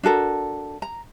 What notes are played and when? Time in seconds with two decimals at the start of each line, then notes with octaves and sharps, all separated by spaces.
0.03 D4 F#4 A4 A#4
0.82 A#5